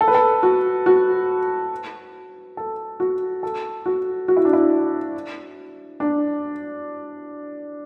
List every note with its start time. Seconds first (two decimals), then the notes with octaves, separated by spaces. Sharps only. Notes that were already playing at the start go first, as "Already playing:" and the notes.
0.01 A4
0.08 B4
0.15 A4
0.43 F#4
0.86 F#4
2.57 A4
3.00 F#4
3.43 A4
3.86 F#4
4.28 F#4
4.37 E4
4.45 D4
4.53 E4
6.00 D4